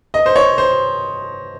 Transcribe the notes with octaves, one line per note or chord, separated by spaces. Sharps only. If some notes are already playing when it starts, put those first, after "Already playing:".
D#5
C5
C#5
C5